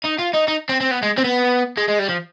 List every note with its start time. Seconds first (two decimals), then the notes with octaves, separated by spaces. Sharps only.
0.05 D#4
0.19 F4
0.34 D#4
0.48 D#4
0.69 C4
0.81 C4
0.91 B3
1.03 G#3
1.18 C4
1.24 B3
1.78 G#3
1.88 G#3
1.99 G3
2.09 F3